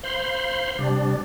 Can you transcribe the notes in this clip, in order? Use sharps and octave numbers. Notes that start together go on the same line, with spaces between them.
C5 F5 B5 C6
C3 G3 D4